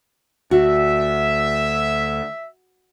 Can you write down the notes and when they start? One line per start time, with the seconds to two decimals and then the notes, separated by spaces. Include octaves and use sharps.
0.51 D2 F#4 E5